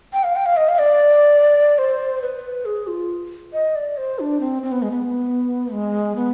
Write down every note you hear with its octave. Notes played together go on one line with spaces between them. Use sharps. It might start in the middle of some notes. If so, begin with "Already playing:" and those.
G5
F5
G5
F5
D#5
F5
D5
C5
B4
G#4
F4
D#5
D5
C5
D4
C4
C4
B3
G#3
B3
G#3
B3